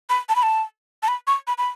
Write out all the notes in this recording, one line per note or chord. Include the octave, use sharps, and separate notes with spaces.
B5
A5
B5
A5
A5
B5
C#6
B5
B5